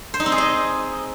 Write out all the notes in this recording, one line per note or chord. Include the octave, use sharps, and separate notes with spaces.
C5
D#4
C4
G#4
D#5